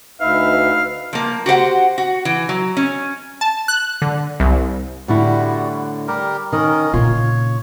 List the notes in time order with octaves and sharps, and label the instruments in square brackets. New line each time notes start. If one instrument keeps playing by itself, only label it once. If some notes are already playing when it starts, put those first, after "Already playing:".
[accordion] D2 E5 [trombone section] D#4 B4 [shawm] F5
[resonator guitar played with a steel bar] F3 A#3
F#4 G4 C5 F#5
F#4
E3
F#3
C#4
[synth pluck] A5
F#6
D3
C2
[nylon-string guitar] A2 D3 E4 [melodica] G3 F#4
[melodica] G3 G4 A#4
[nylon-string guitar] D#3 [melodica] C#4 A#4 D#5
[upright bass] A#2 C#3 [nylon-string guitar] F4 [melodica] C#5